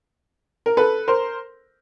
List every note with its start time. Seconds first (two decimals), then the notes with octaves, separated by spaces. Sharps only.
0.66 A#4
0.77 A4 B4
1.08 A#4 C5